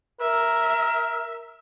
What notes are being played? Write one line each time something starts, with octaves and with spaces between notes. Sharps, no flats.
A#4 E5